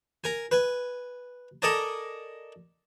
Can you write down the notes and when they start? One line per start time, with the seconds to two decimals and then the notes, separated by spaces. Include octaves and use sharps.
0.24 A#4 G#5
0.51 B4 G#5
1.62 A4 A#4 D5 D#5 G#5 A5